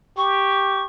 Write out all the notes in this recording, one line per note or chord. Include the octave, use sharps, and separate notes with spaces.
G4 C#6